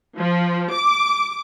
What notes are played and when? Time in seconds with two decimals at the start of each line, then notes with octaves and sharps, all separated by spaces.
0.17 F3
0.72 D6